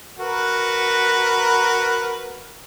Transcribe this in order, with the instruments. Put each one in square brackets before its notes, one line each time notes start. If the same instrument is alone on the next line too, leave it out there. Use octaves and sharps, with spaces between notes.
[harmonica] F#4 A#4 B4